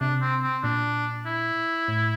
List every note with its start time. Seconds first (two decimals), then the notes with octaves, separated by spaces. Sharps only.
0.01 C3 D4
0.21 C4
0.42 C4
0.63 A#2 D4
1.26 E4
1.88 A2